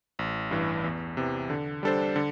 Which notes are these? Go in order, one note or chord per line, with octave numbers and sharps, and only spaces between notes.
A1
G2 E3
E2
C3 E3
D3
G3 D4 A4 C5
D3